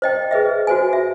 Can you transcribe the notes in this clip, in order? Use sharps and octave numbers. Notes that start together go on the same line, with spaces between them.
C5 D#5 G5
G#4 B4 D#5 E5
F#4 C5 G#5
E5